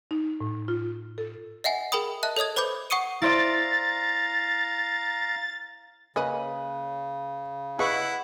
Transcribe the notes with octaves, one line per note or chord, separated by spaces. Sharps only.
D#4
A2
F4
A4
D#5 E5 F#5 G#5
G#4 A#4 G5 B5 D#6
D#5 E5 A5 F#6
A4 C#5 D#5 D#6 G#6
B4 C5 B5 D6 G6
F#5 C#6 D#6 C#7 D#7
E4 C5 D5 F5 A#5 A6
C#3 A#3 C#4 B4 D#5
E4 G#4 B4 D#5 F#5 C#6